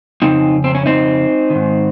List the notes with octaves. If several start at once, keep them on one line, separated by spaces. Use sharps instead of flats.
F2 C#3 C4 D#4
C4
C#4
C4 D#4
G#2 D#3